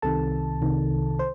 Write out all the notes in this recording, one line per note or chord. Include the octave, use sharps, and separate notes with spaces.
C2 C3 D#3 A4 A5
C2 C3 D#3
C5